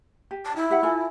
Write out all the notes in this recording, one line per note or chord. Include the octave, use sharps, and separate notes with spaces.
G4
A5
E4
G4 E5 F#5
F4 A4 G#5